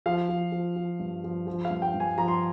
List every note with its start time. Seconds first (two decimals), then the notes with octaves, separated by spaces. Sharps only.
0.06 F3 F5
0.29 F3
0.52 F3
0.76 F3
0.99 G2
1.24 F3
1.47 F3
1.65 F5
1.70 G2
1.82 G5
1.94 G2
2.00 G#5
2.18 F3 A#5
2.28 C6